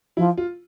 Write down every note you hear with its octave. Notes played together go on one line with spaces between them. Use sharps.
F3 E4
F4